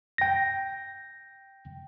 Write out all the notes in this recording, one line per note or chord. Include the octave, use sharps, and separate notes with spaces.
G5 A#6